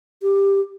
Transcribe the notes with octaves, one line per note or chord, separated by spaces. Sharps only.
G4